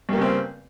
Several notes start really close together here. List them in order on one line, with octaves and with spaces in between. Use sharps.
G2 A#3 C#3 C4